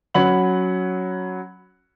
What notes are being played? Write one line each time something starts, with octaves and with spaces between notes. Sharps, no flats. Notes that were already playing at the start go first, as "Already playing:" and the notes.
F#3 C#4 F#5 B5 F#7